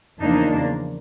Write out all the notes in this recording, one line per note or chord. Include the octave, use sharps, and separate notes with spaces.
E2 C#3 F3 A#3 D4 D#4